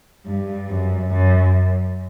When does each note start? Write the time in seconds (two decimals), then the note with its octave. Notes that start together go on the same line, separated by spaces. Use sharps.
0.26 G2
0.69 F#2
1.11 F#2